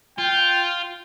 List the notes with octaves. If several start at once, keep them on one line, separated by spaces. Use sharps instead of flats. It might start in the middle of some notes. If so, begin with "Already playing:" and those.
F4 G5